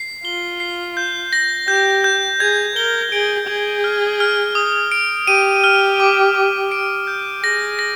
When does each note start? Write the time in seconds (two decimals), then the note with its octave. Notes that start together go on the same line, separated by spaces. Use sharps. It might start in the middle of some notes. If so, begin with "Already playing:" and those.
Already playing: C7
0.25 F4 G7
0.60 C7
0.97 G6
1.33 A#6
1.68 G4 G6
2.04 G6
2.40 G#4 G#6
2.76 A#4 G7
3.12 G#4 D7
3.48 G#4 G#6
3.84 F6
4.20 F6
4.55 D#6
4.92 D7
5.27 G4 D#7
5.64 F6
6.00 D6
6.35 D6
6.72 D7
7.07 G6
7.43 G#4 A#6
7.79 A#6